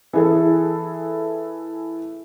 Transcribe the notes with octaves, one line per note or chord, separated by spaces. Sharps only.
E3 G#4 A4